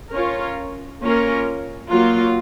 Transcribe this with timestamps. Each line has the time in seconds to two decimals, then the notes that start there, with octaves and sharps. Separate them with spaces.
0.12 C#4 F4 A#4 C#5
1.01 A#3 C#4 F4 A#4 C#5
1.90 F#3 A#3 F4